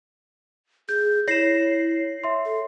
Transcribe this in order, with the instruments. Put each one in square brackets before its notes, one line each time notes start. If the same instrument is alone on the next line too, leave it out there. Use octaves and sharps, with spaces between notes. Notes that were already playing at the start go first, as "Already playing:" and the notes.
[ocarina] G#4 [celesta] G6
[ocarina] E4 [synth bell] C#5 C7 [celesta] A#6 E7
[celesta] E5 C6
[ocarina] A4